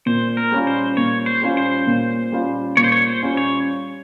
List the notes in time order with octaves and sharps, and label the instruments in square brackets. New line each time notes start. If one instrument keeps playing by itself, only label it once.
[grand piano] A#2 [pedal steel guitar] C5
[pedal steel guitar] A#4
[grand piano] G3 C#4 F4
[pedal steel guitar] C5
[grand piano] A#2 [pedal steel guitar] C#5
[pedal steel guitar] C5
[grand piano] G3 C#4 F4
[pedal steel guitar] C5
[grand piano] A#2
G3 C#4 F4
[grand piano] A#2 [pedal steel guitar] C#5
[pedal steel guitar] C5
C#5
C5
[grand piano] G3 C#4 F4
[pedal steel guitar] C#5